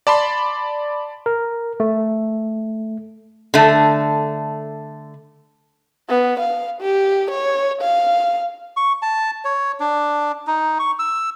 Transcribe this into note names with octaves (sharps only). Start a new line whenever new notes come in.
D5 A5 B5 C6
A#4
A3
D3 A3
B3
F5
G4
C#5
F5
C#6
A5
C#5
D4
D#4
C#6
E6